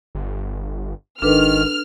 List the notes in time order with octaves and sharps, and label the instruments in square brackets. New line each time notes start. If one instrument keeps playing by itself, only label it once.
[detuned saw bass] G1
[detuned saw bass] G#1 [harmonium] D#3 [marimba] D4 A4 B4 [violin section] F6